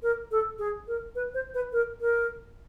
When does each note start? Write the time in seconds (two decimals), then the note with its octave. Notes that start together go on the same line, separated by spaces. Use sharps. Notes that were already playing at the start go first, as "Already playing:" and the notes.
0.03 A#4
0.31 A4
0.59 G#4
0.88 A#4
1.15 B4
1.34 C5
1.54 B4
1.72 A#4
2.01 A#4